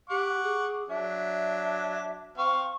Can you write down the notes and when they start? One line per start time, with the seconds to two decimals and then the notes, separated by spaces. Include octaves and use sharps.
0.10 G4 F#5 C#6 D6
0.43 G#4
0.89 F#3 D4 E5
2.38 C4 F5 C#6